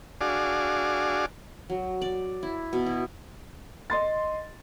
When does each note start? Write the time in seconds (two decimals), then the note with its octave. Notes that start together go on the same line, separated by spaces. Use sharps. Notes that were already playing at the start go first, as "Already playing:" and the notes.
0.21 D4 F#4 G#4 D5 F5
1.70 F#3
2.02 D5
2.43 E4
2.73 B2
2.86 E4
3.90 D#5 C6 A6